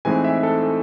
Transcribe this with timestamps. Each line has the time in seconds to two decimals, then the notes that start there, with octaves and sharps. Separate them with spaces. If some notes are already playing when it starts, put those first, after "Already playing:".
0.05 A2 E3 G#3 C4 D#4 G#5
0.24 E5
0.43 A4
0.63 A4